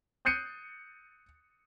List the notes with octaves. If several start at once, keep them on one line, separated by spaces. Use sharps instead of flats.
D#6 F#6 G6 C7 C#7 D#7